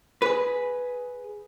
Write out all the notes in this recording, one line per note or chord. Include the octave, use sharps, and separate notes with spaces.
G#4 B4